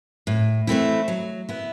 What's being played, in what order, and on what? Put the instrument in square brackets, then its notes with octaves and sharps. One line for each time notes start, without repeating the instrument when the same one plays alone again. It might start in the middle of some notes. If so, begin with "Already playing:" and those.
[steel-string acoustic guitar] A2
E3 A3 C4 E4
F#3
B3 E4